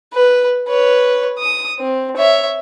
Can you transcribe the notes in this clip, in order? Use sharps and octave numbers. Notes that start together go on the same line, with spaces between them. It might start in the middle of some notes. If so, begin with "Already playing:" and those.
B4
B4 C#5
D#6
C4
C#5 E5